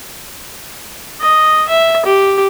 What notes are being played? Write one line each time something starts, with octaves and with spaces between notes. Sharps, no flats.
D#5
E5
G4